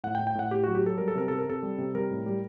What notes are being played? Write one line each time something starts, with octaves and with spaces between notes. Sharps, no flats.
A2 F#5
G5
A2
G5
A2 F#5
A2 G4
F#3 F#4
G4
F#3 A4
G3 A#4
A4
C3 A#4
C3 A4
A#4
C3 A4
G3
C3
G3 A#4
A2
G3